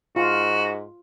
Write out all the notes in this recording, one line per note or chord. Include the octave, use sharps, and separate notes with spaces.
G#2 F4 F#4